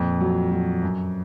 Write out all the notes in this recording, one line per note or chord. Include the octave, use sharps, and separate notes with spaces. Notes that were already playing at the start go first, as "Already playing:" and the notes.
Already playing: F2 A#2
F#3
F#3
F#2